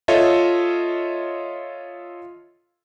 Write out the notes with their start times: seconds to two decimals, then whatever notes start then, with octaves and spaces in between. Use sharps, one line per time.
0.08 F4 A4 C#5 D#5 E5